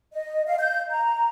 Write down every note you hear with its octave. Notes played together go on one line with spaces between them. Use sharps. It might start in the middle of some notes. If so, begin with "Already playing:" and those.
D#5
F5
G6
A#5